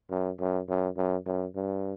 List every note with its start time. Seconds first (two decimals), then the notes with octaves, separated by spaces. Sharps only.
0.10 F#2
0.40 F#2
0.69 F#2
0.97 F#2
1.26 F#2
1.55 G2